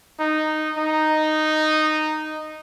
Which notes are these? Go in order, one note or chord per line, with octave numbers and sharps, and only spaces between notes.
D#4
D#4